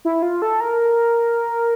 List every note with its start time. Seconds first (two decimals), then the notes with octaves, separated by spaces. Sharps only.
0.05 E4
0.22 F4
0.42 A4
0.60 A#4